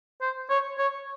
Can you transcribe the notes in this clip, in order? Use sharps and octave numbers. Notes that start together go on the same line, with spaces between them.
C5
C#5
C#5